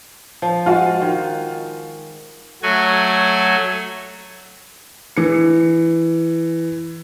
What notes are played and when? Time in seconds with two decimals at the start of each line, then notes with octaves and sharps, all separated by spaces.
0.42 F3
0.66 G#3 F4 F#4
1.02 D#3
2.63 F#3 A3 F#4 G#5
5.17 E3 C#7